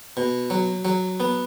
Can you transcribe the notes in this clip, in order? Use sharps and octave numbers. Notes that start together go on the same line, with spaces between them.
B2
F#3
F#3
B3